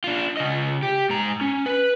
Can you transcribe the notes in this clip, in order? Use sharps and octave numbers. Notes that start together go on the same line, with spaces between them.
D4 F4
C#3 D#5
G4
G#2 A#5
C#4
B4